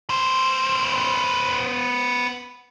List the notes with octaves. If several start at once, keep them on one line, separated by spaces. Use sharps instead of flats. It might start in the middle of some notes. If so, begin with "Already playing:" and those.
B3 C5